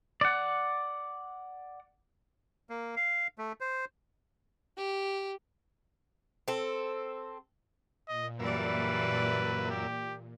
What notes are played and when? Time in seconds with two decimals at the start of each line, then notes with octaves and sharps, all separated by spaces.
0.21 D5 F#5
2.70 A#3
2.96 F5
3.38 A3
3.60 C5
4.77 G4
6.48 C4 A4
8.08 A#2 D#5
8.40 F#2 E3 G3 A#3 B4 D5 E5
9.71 G4